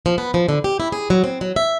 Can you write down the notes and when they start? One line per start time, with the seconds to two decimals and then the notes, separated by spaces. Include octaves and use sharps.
0.06 F3
0.18 B3
0.34 F3
0.49 D3
0.64 G4
0.80 E4
0.92 G#4
1.10 F#3
1.24 C4
1.41 F#3
1.56 E5